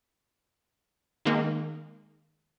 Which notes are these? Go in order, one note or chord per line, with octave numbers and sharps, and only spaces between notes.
D#3 G#3 A#3